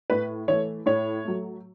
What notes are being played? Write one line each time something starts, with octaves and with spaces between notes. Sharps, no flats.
A2 B4
E3 A3 C#5
A2 C#5
F#3 A3